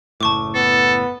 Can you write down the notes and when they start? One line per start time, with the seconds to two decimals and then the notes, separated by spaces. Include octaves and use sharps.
0.21 F#1 A2 A5 C#6 D6
0.55 B3 A4